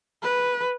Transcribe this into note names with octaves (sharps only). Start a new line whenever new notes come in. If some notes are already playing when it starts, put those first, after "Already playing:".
B4